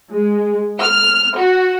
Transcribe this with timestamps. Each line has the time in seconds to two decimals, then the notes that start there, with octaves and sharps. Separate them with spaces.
0.11 G#3
0.80 F6
1.37 F#4